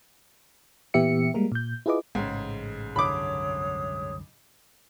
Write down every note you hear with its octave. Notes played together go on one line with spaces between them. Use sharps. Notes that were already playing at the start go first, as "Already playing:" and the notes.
A#2 E3 B3 G4 E5 C#7
G3 G#3 A#3 A#4
A#2 G6
E4 F4 G#4 B4 D#5 D6
A1 G#2 C#3
C2 F#2 D3 C#5 B5 D6 D#6